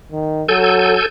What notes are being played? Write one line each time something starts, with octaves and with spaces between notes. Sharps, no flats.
D#3
F#3 A4 G#5 G6